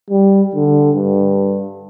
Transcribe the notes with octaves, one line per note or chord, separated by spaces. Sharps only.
G3
D3
G2